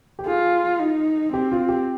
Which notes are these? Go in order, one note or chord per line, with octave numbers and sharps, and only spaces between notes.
G4
F4 G#4
D#4
C4 G4
F4
G4